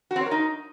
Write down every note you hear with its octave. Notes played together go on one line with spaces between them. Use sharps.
F#4
C4
C#5
A#4
D#4